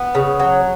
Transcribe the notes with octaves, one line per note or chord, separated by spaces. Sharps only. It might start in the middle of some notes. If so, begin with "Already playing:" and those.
Already playing: B3
C#3
F#3